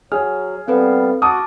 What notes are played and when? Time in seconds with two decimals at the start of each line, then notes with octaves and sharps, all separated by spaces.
0.12 F#3 G#4 F6
0.68 G3 B3 C4 A4 B4 F5
1.22 F#4 F#5 A5 D6 D#6 F6